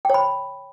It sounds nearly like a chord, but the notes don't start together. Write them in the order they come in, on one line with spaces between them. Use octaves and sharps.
G5 C#5 B5